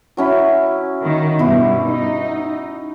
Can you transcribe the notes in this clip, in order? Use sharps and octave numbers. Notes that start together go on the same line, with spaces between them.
F#3 C#4 E4
D#3
G2 B2 E4
D#4